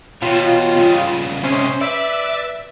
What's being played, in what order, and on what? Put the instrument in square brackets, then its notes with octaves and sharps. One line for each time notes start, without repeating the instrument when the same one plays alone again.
[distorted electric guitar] B2 [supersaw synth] F4 [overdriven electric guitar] G4 C#5
[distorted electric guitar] G2 C#3
[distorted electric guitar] C3 G#3 [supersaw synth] C#4 [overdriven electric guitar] C5
[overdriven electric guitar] B4 [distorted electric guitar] D5 [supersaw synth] E5